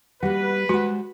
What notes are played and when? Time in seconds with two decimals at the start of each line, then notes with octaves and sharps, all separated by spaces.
0.23 G3 A#3 F#4 B4
0.69 G3 G#3 F#4 C5 F#5